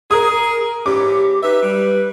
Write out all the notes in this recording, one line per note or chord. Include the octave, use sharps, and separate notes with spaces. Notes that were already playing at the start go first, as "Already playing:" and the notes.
G#4 A#4 D#6
G#2 E3 C#4 G4 D6
D#4 G4 B4 E5
G3